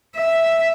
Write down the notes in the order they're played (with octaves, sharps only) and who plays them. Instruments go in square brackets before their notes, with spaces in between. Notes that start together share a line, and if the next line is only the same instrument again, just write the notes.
[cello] E5